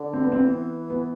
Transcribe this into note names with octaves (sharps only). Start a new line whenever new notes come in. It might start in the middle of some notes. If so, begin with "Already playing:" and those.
Already playing: D3
C4
B3
C4
E3 B3
B3